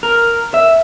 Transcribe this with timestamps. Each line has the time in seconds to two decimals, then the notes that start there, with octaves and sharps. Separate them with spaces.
0.03 A#4
0.54 E5